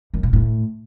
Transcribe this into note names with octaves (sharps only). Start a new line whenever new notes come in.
F#2
A#2
A2